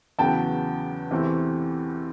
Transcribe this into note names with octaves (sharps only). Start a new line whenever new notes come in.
E2 C#3 F#3 B3 G5 A5
E2 C3 E3 A3 C4